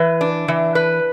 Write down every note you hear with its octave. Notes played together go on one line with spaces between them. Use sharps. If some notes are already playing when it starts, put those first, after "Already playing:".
Already playing: E3 B4
D4
E3
B4